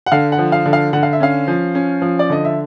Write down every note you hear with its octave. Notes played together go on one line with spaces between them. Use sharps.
F#5
D3 F5
F#5
F3
F5
D3
F5
D3 F#5
F5
E5
C#4 F5
F3
C#4
F3
D5
D3 D#5
E5